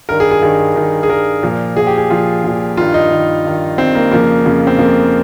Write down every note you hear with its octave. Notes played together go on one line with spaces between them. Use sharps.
G2 D#3 A#4
G#4
G#4
G2 D#3 G#4
G2 D#3
G#4
G2 D#3 A#4
A#2 F3
A#2 F3 G#4
G4
G#4
A#2 F3 F4
A#2 F3
G2 D#3 F4
D#4
G2 D#3
G2 D#3
G2 D#3 C4
A#3
F2 C#3 F3 A#3
F2 C#3 F3
C4
F2 C#3 F3 A#3